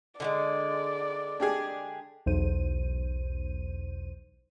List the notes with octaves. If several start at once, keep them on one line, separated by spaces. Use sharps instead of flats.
D3 F#3 G#3 D5
D4 G4 G#4
B1 E2 C5 D#7